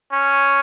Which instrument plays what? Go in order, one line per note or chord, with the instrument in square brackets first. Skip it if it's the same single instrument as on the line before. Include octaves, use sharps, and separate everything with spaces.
[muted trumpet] C#4